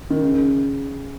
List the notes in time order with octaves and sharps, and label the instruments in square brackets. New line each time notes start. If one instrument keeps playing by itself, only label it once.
[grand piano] D#3
C#3